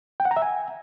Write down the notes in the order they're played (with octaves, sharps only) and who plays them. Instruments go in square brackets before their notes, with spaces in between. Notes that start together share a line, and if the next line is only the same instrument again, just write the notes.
[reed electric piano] G5
F#5
A#5
E5
G#5